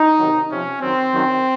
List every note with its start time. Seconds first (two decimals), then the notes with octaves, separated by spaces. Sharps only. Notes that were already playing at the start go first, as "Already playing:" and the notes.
Already playing: D#4
0.18 C3 D#3 F#3
0.50 C3 F3 C#4
0.81 F#2 D#3 F#3 C4
1.13 F#2 D#3 F#3